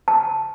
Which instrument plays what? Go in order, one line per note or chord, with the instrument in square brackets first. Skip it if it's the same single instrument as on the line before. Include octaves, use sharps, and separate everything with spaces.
[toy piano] A5